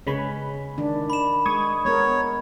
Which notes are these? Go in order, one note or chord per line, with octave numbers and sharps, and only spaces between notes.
C#3 G#3 C#4 B4 C#5 B5
D#3 D4
B5 E7
G#3 C#6 D#6 G#6
G#3 B3 A#4 C#5